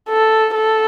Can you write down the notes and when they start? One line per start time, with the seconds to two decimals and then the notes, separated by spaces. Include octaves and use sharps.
0.10 A4
0.55 A4